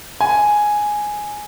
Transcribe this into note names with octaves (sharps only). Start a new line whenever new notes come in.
G#5